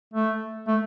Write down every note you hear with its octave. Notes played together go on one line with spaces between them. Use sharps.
A3
A3